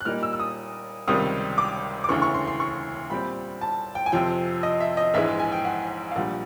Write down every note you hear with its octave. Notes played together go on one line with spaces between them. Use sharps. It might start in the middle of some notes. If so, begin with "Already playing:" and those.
F#6
A#2 G3 A#3 D#4 F6
E6
E6
D#6
C#2 C3 D#3 G3 D#6
D6
D6
E1 D2 C#3 E3 C#6
C#6
C6
C6
C#6
A#2 G3 C4 B5
A5
G5
G#5
F2 C3 F3 G5
D#5
E5
D#5
A#1 G#2 E3 G#3 E5
G#5
G5
F#5
F5
A#1 A#2 G3 F#5